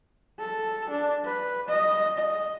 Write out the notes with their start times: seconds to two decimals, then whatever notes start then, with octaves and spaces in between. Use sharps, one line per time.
0.40 A4
0.90 D4
1.25 B4
1.69 D#5
2.18 D#5